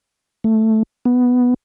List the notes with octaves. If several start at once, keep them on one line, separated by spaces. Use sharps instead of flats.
A3
B3